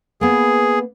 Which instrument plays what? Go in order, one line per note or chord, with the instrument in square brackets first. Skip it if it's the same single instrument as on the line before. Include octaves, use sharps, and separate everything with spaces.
[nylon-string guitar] A#3 B3 [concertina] G#4